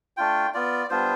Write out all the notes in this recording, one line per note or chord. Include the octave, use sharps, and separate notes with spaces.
A3 D4 F4 G5
B3 F4 D5
G3 B3 D4 F4 C5